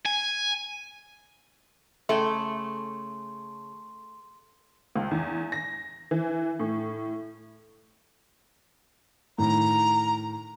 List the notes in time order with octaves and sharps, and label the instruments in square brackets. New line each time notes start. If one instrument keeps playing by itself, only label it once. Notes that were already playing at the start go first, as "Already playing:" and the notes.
[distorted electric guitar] G#5
[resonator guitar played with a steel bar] C#3 A4 G5 [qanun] A3 [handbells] E5 [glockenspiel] C6
[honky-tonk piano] C#2
E2
A#6
E3
A2
[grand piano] A2 D#3 [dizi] A#5